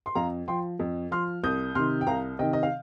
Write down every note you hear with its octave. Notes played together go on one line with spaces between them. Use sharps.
C6
F2 F5 A#5
F3 G5 C6
F2
F3 C6 F6
C2 D#6 G6
C3 D#3 C6 F6
G5
C2 F5 A#5
C3 D#3 D#5 G5
D#5
F5